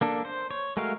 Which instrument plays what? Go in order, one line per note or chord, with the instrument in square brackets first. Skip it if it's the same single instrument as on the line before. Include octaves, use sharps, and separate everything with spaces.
[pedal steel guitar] A#3 D4 A4
C5
C#5
G#3 A3 F#4 A#4 F5